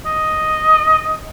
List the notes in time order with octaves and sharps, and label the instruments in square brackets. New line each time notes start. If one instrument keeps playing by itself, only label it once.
[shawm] D#5